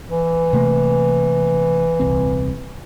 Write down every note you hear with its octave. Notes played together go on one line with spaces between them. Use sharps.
E3
C3 A3 A#3
D#1 C2 C4